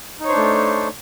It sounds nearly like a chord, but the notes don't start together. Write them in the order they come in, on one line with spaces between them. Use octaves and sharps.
D#4 C#5 C5 D4 A3